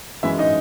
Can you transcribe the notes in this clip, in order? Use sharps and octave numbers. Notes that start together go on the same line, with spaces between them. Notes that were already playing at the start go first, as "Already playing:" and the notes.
F#2 E3 G#3 E4 E5
D#4 D#5